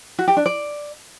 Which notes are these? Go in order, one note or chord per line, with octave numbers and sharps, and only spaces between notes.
F#4
G4
D4
D5